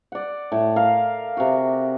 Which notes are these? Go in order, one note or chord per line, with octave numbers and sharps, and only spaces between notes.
D5 F#5
A2
A#4 F5
C3 F#4